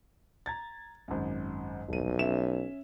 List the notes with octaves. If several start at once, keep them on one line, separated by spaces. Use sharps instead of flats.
A#5 G#6 A6
G#1 F#2
D#1 B1 D#7
C#4 E5 E7